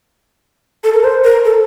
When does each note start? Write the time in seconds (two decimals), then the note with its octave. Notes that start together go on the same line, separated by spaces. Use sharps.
0.84 A4
0.94 A#4
1.04 C5
1.24 A#4
1.45 A4